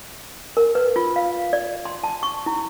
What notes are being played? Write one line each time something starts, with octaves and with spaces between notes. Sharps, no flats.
A#4
B4
F4
F5
D5
C6
A5
C#6
E4